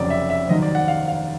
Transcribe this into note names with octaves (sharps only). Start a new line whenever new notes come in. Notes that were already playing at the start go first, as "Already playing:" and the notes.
Already playing: F1 F2 C#3 F#3 D5
E5
E5
F1 D#2 D#3 F#3 D#5
D5
F#5
F5
F5